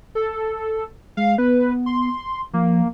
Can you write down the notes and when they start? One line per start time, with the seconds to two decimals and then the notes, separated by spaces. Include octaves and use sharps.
0.15 A4
1.17 G#3 F5
1.38 B3 B4
1.86 C6
2.53 F3 A#3